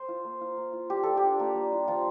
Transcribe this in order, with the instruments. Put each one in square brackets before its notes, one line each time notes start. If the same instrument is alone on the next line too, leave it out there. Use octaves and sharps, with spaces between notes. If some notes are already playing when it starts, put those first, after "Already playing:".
Already playing: [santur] C5
F4
A#3
F4
A#3
F4
G3 G4
F4 A4
G4
D4
A#3
G3
F4
F3 F4